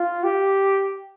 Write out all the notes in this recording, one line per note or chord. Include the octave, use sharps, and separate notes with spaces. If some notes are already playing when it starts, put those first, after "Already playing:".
Already playing: F4
G4